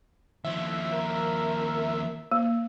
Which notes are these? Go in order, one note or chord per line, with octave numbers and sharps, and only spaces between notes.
D#2 F3 E5
A#4
A#3